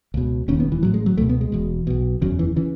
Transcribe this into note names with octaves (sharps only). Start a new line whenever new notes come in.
C#2 B2
E1 D#2 C#3 C#4
B3
E3
A1 A2 F#3
G#3
F#3
C#2 B2 A3
B3
G#3
E1 E2 B2
B1 B2
F#1 E2 C#3 F#3
E3
C#3 E3